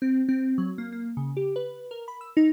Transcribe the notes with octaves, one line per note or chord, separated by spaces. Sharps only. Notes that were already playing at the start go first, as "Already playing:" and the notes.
C4
C4
F#3
A#3
A#3
C#3
G4
B4
A#4
B5
E6
D#4